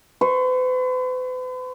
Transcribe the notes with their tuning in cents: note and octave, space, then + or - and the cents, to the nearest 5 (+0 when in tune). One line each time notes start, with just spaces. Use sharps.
B4 +45 C#6 -30